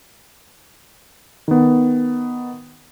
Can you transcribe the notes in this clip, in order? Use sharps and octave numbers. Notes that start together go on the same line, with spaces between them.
D#3 B3